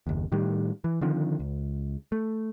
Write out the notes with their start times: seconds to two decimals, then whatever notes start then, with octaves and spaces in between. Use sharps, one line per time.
0.07 F#1 D#2
0.32 A2 D#3 G3
0.84 E3
1.01 D3 D#3 F3 C4
1.39 C#2
2.12 A3